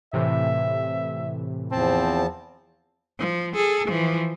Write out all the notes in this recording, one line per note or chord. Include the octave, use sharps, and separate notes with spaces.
A2 C3 E3 E5
E2 F3 C4 A5
F3
G#4 A4
E3 F3